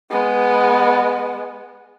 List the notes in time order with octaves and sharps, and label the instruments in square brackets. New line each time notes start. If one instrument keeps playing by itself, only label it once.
[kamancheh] G#3 B3